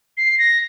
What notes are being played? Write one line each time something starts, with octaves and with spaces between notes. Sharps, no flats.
C7
A#6